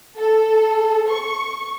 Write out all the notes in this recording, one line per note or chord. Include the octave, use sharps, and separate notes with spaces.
A4
C#6